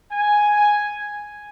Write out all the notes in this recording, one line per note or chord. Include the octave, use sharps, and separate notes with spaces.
G#5